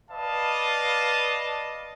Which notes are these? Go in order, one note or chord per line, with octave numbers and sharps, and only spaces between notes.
B4 D5 D#5 F5 A5